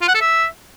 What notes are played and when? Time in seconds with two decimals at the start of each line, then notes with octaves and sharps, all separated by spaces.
0.01 F4
0.08 F#5
0.14 A4
0.21 E5